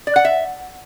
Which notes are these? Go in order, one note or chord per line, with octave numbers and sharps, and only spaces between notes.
D5
F#5
E5